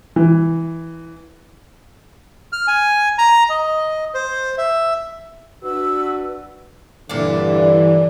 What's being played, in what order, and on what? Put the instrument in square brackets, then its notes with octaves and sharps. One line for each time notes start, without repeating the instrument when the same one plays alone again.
[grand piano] E3
[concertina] F6
G#5
A#5
D#5
C5
E5
[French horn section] D4 B4 [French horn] F#4 [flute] E6
[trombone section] G2 D3 [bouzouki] A#2 D4 [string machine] E3